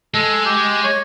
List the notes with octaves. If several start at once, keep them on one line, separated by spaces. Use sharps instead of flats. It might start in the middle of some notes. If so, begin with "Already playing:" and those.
G#3 A4
G4
C#5